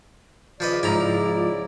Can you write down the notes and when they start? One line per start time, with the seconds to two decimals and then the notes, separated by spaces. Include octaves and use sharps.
0.60 C#3 F3 F4 B4 D5 D#5
0.83 G#2 F3 E4 A#5